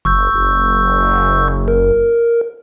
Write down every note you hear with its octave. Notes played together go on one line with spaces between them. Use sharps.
F#1 C#6 E6 G6
F#1
A#4